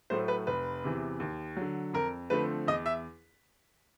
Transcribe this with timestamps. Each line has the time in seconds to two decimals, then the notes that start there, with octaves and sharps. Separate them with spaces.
0.10 A2 F#3 A3 C5
0.28 B4
0.47 F1 B4
0.84 E2 C3 E3
1.20 D#2
1.57 D3 F#3
1.94 F2 A#4
2.30 D3 F3 A3 C4 B4
2.67 E2 D#5
2.86 E5